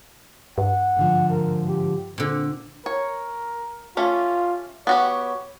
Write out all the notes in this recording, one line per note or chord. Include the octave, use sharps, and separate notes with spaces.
G2 F#5
G#2 D3 F3
A#4
G4
A#2 D3 C4
A#4 C#5
A3 C#4 F4 G4
B3 F#4 G4 C#5